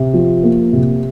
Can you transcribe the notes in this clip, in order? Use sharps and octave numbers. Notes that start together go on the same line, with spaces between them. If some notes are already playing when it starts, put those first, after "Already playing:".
Already playing: C3
F3
A#3
C3